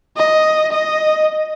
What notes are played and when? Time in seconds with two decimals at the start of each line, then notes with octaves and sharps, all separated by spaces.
0.16 D#5
0.72 D#5